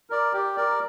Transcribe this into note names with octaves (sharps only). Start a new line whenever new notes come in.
A#4 D5
G4
A#4 D5